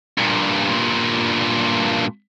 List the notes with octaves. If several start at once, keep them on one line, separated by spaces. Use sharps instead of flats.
G2 A#2